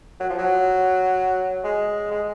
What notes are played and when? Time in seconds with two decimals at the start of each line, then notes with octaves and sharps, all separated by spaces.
0.20 F#3
0.30 F3
0.38 F#3
1.64 G#3
2.11 G#3